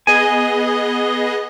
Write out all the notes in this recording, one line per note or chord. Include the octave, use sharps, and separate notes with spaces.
B3 G#4 D#5 G#5